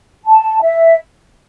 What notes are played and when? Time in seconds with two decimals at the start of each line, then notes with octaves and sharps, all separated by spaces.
0.24 A5
0.62 E5